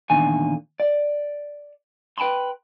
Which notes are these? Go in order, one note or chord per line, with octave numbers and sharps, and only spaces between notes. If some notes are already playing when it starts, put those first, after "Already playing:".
E2 A#2 D3 D#3 G#5
D5
B4 G5 A5 B5 C6